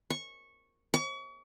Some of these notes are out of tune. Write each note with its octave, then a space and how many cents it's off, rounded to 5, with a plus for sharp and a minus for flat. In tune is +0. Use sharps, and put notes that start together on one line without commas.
C#6 -10
C#6 +40